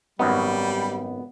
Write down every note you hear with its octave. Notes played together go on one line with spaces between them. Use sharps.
G#1 F#2 G3 B3 D#4